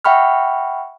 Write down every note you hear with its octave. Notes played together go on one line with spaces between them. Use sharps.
E5 F#5 G5 B5 C#6 F6